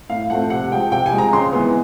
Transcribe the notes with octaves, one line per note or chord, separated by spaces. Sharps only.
A2 F5
F3 A3 C4 F#5
C3 F#5
F3 G#3 G5
C3 G5
G#5
F3 G#3
A#5
C#3 C6
E3 G#3 B3